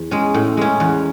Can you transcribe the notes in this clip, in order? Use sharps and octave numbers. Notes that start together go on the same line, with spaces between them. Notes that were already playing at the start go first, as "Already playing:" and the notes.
Already playing: E2
G#3 C#4
A2
G#3 C#4
E2